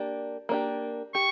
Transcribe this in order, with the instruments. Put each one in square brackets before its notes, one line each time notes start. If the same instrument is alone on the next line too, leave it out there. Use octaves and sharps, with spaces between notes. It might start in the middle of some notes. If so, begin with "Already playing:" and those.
Already playing: [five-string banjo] A#3 D4 G4
A#3 D4 G4
[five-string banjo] G4 [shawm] C#6